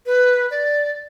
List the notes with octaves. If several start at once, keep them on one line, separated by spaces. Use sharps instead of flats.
B4
D5